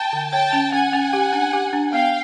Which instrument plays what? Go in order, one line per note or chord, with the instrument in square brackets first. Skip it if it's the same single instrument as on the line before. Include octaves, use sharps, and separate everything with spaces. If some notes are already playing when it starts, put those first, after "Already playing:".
Already playing: [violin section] G5 A5
[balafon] D3
[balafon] C#5 [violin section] G5 A5
[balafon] C#4
[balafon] C#4 [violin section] F#5 G#5
[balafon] C#4
G4
D4
G4
D4
[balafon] B3 [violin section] F5 G5